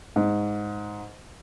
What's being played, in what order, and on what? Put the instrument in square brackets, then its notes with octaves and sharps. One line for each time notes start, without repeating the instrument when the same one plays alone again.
[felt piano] G#2